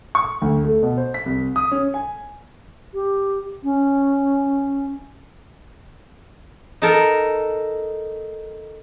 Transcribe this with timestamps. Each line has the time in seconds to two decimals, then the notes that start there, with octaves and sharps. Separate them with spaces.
0.15 C#6
0.42 D2
0.64 A3
0.83 B2
0.97 C5
1.14 B6
1.26 C2
1.56 D#6
1.72 C#4
1.94 G#5
2.94 G4
3.64 C#4
6.82 D#4 A4 A#4